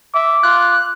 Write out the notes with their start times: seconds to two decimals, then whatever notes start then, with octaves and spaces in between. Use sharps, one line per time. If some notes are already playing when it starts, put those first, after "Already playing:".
0.15 E5 D6
0.43 F4 F#6